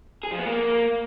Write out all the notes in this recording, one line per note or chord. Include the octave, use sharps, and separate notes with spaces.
G#4
F3
B3
A#3